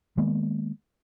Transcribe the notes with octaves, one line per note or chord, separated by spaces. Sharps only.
D#3 G#3 A#3 B3